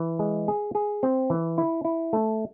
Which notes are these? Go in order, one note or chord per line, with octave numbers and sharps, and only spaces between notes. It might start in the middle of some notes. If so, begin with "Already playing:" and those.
Already playing: E3
G#3
G#4
G#4
C4
E3
E4
E4
A3